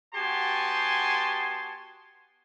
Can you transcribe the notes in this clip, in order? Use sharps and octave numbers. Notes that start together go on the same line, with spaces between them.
B3 F#4 G4 G#5 A5 C6